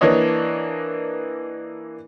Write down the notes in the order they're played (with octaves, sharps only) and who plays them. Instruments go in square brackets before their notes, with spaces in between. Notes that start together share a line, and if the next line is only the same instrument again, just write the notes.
[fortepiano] E3 A#3 D4 C#5 D#5